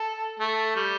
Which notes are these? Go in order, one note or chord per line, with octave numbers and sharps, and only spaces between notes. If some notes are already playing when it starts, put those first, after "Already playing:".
Already playing: A4
A3
G3